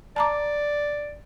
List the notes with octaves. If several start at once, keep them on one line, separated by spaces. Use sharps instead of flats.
D5 A5 A#5 D6